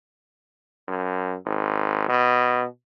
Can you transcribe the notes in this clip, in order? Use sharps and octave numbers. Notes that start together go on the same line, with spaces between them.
F#2
G#1
B2